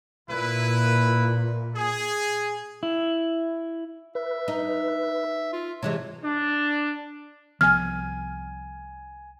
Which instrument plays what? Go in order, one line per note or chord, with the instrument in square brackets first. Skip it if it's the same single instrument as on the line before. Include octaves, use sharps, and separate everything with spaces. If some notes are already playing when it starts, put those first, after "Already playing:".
[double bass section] A#2 [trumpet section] E4 B4
[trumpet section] G#4
[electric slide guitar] E4
[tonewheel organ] B4 [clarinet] E5
[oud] D#4
[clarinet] F4
[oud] C3 E3 G#3 [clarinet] C#5
[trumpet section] D4
[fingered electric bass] C2 F3 B3 [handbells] G#5 G#6 [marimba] F6